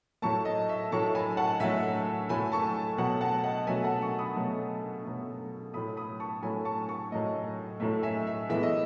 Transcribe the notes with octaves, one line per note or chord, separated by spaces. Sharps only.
A2 F#3 A3 A5 C#6
D#5
E5
A2 F#3 A3 A5 C#6
G#5 B5
F#5 A5
A2 F#3 A3 E5 G#5
A2 F#3 A3 G#5 B5
A5 C#6
B2 F#3 A3 F#5 A5
F#5 A5
D#5 F#5
B2 F#3 A3 E5 G#5
F#5 A5
A5 C#6
B5 D#6
B2 F#3 A3
B2 F#3 A3
A2 F#3 A3 B5 D#6
B5 D#6
A5 C#6
A2 F#3 A3 G#5 B5
A5 C#6
A5 C#6
A2 F#3 A3 D#5
A2 F#3 A3 E5
E5 G#5
E5
A2 E3 G#3 B3 E5
D#5